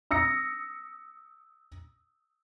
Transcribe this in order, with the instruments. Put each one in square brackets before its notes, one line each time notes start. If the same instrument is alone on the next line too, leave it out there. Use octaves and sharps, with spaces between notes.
[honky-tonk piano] D#6 E6 A#6 C#7